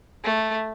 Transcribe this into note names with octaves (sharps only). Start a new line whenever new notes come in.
A3